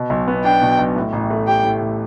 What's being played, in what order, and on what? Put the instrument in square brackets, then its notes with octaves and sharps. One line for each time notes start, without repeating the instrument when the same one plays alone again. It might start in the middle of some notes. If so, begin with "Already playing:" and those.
Already playing: [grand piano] B2
B1
B3
[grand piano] D4 [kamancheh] G5
[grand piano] B2
B1
A2
A1
A3
[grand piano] G4 [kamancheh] G5
[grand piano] A2
A1